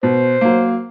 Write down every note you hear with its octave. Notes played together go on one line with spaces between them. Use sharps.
B2 C5
F#3 A#3